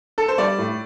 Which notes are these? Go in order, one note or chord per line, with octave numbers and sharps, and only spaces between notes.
A4
C5
G3 D5
A2